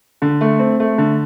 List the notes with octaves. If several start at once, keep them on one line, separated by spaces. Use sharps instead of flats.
D3
A3
C4
A3
D3